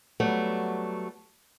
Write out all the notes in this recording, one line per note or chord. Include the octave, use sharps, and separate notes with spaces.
F#3 G3 A3 B3